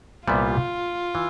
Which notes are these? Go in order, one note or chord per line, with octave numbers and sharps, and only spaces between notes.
C2 A#2 G3 B3 F4
E3